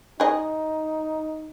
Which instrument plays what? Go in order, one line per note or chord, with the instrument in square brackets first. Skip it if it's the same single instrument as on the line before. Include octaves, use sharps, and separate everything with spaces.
[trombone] D#4 [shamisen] G#4 D#5